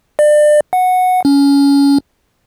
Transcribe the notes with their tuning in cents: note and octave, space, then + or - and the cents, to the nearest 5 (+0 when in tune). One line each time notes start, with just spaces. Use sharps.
D5 +30
F#5 -10
C#4 +20